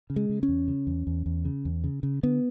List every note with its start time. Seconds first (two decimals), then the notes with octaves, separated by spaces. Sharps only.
0.10 C#3
0.16 G#3
0.29 C#3
0.43 C#4
0.48 E2
0.68 C#3
0.87 E2
1.07 E2
1.26 E2
1.45 C#3
1.65 E2
1.84 C#3
2.03 C#3
2.23 D3 B3